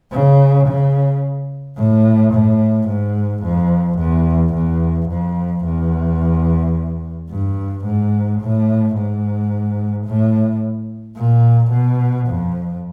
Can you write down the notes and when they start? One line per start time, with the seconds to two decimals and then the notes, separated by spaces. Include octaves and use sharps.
0.11 C#3
0.67 C#3
1.77 A2
2.33 A2
2.88 G#2
3.43 F2
3.99 E2
4.54 E2
5.09 F2
5.65 E2
7.30 G2
7.85 G#2
8.41 A2
8.96 G#2
10.07 A2
11.16 A#2
11.72 B2
12.27 F2